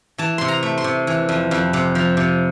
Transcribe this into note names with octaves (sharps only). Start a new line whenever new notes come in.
E3 A5
C3 C6
A#5
A3
C6
C3
E3
F2
F2
C3
F3
C3